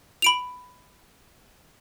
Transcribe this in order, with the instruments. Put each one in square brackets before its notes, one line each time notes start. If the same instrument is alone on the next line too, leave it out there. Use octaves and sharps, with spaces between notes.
[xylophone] B5 D7 F7